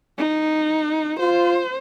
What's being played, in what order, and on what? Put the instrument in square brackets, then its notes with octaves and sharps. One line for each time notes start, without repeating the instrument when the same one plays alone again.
[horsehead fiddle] D#4
[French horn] F4 [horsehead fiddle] C5